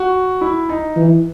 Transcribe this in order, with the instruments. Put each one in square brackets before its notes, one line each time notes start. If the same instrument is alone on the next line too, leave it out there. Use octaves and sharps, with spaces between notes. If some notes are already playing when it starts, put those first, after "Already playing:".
Already playing: [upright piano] F#4
E4
D#4
[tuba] E3